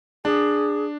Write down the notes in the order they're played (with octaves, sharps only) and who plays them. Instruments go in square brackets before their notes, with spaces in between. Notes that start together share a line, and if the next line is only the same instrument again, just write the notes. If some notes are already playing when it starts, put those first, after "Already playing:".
[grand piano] D4 [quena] G#4